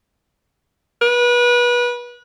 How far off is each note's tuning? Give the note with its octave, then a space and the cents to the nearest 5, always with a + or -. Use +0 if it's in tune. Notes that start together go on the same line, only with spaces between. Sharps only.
B4 -30